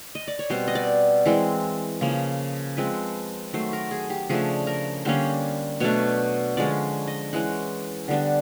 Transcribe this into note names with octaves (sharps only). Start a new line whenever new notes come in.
D#5
D5
C#5
B2 G3 C4 C5
D#5
D5
E3 G#3 C4
C#3 F3 A#3
F3 G#3 C4 B4
D#3 F#3 A3 C5
A#4
G#4
G4
C#3 F3 A3 D4 G#4
A#4
D3 G3 A#3 C#4 C5
B2 F#3 A3 D4 C#5
D3 F3 G#3 C#4 D5
D#5
E3 G#3 C#4 F#5
D3 G3 B3 D4